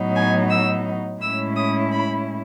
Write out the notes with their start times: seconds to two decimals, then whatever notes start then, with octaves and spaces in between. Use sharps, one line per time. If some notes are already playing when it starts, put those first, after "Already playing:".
Already playing: A2 F#3 B3 D#4
0.15 G#5
0.50 E6
1.21 A2 G#3 C#4 E4 E6
1.57 D#6
1.92 B5